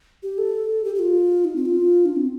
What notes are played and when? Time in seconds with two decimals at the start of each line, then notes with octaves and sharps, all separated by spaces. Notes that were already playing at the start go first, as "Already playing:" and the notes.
0.23 G4
0.38 A4
0.84 G4
0.95 G4
0.99 F4
1.45 D#4
1.55 C4
1.66 F4
2.06 D4
2.16 C4